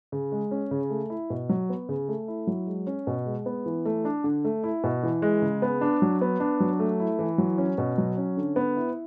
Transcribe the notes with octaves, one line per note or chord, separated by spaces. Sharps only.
C#3
G#3
C#4
C#3
A3
E4
B2
F#3
B3
C#3
A3
E4
F#3
G#3
C#4
B2
G#3
B3
E3
A3
D4
D3
A3
E4
B2
E3
G#3
C#3
B3
D4
F#3
B3
D4
F#3
A3
E4
E3
F#3
C#4
B2
F#3
C#4
D3
B3
E4